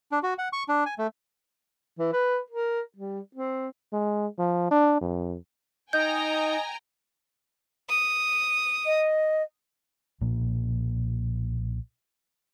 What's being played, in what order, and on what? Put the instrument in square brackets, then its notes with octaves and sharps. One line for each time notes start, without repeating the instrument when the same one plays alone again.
[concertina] D4
F#4
F#5
C#6
D4
G#5
A3
[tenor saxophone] E3
B4
A#4
G3
C4
[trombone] G#3
F3
D4
F2
[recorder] D#4 [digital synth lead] D#5 [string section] G5 G#5 A#5 [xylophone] G6
[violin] D#6
[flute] D#5
[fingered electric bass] B1 A#2 F3 A#3